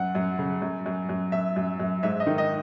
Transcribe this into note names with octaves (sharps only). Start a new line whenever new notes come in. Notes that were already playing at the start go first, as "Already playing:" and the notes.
Already playing: F#2 F#5
F#2
C#3
F#2
F#2
F#2
F#2 E5
F#2
F#2
G#2 E5
D#5
D#3
D#5